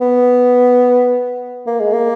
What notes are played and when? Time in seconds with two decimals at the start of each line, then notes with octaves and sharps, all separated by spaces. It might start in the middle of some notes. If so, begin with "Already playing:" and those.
0.01 B3
1.67 A#3
1.80 G#3
1.93 A#3